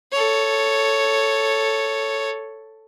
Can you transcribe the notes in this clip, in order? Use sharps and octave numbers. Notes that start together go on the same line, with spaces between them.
A4 C#5